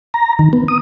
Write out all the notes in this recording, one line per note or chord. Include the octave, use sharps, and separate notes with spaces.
A#5
D#3
B3
D#6